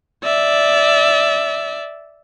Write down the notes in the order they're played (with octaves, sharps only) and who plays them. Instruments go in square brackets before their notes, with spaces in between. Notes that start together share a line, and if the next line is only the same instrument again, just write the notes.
[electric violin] D5 E5